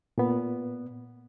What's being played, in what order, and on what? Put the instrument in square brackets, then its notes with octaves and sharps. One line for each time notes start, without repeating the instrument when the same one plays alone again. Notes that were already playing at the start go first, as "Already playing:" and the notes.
[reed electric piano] A#2 B3